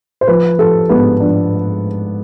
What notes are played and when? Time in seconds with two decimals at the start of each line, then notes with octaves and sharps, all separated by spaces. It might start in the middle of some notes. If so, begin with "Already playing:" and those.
0.21 C5
0.28 F3 B4
0.59 F3 A4
0.89 G#2 B3
1.20 F3 D4